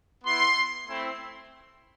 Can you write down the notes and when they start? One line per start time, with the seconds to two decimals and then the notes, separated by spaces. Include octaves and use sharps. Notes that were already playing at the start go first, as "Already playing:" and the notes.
0.24 B3 E4 C6
0.85 A3 C4 E4